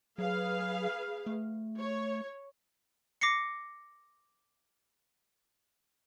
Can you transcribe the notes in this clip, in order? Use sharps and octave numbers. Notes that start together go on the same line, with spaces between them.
F#3 G#4 B4 F5
A3
C#5
D6 A#6 C7 C#7